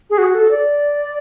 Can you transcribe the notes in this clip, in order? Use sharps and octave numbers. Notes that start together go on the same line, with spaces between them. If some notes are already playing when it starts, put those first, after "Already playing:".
G#4
F#4
A4
D5